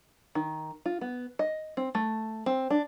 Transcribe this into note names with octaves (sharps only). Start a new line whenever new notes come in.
D#3
F4
B3
D#5
C4
A3
C4
D4